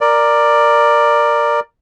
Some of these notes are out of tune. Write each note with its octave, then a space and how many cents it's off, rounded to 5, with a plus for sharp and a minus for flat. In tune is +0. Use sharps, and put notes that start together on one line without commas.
A#4 +0 D5 +10